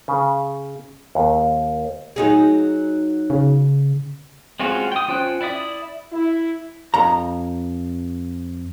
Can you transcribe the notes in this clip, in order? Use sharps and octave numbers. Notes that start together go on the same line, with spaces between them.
C#3
D#2
F#3 D#4 G#4
C#3
G#3 C4 C#4 F4 F#4
G5 D#6
C#4 F4 C5 G5 F#6
E4 D5 E5 D#6
E4
F2 A#5